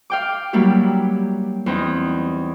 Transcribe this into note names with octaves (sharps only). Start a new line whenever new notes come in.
F5 G5 D6
F#3 G3 A#3 D4 E4 G4
E2 C4 D#4